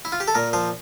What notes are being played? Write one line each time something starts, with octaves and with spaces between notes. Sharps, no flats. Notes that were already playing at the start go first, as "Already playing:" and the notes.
E4
F4
G4
A4
A#2 A#4
F3 C5